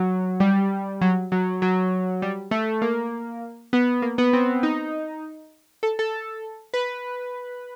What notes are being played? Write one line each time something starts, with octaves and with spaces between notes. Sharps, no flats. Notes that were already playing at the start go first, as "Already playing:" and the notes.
Already playing: F#3
G3
F#3
F#3
F#3
G3
A3
A#3
B3
A#3
B3
C4
D#4
A4
A4
B4